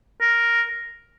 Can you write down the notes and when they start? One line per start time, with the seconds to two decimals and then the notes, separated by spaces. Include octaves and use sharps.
0.21 A#4